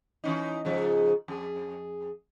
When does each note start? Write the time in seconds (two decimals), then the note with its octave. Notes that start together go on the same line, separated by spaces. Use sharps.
0.24 E3 C#4 D#4
0.65 G#2 C#3 F3
1.28 F2 G#4